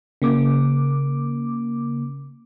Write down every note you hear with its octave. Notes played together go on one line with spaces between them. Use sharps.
C#3 A#3 D6